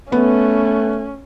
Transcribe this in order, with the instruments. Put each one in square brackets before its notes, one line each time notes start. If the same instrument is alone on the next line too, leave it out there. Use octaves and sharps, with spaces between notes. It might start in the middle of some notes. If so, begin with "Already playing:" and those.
[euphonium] A3 [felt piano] B3 [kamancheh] C#4